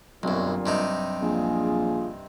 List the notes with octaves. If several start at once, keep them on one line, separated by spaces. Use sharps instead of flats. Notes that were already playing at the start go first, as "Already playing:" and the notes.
B1 F#2 A#2 D3 F#3 G3 C4
G2 C3 D#4
A#1 F4 G#4